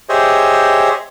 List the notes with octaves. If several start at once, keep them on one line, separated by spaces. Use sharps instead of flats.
G4 G#4 C5 C#5 D#5 E5